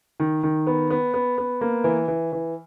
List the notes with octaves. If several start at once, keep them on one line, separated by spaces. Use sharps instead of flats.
D#3
D#3
B3
B3
B3
B3
A#3
E3
E3
E3